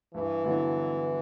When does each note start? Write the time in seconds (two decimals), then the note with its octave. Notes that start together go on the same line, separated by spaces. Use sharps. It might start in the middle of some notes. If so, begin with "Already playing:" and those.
0.14 G2 E3
0.44 D3 F#3 B3 E4